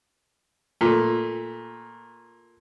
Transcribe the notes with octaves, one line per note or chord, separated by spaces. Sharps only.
A#2 A3